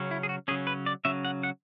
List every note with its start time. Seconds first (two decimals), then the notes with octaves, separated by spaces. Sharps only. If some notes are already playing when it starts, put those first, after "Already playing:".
Already playing: C#3 F#3 C#4
0.11 E4
0.23 G#4
0.29 F#4
0.48 C#3 F#3 C#4 G#4
0.67 B4
0.86 D5
1.05 C#3 F#3 C#4 E5
1.25 F#5
1.43 F#5